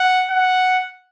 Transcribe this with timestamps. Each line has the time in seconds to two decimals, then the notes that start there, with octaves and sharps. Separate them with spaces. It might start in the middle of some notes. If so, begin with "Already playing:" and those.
Already playing: F#5
0.31 F#5